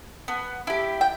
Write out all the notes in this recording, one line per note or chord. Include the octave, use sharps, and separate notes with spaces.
B3
E4 G4
G5